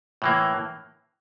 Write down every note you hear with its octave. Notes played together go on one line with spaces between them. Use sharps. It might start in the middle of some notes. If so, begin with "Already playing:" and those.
A2 E3 A#3